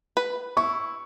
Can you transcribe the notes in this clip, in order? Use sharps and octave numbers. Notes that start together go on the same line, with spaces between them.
B4
E4 C#6